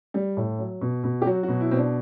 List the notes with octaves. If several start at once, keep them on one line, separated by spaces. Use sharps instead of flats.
G3
A2
F#3
B2
B2
G4
F#3 F#4
F#4
B2
E4
B2 C4
D4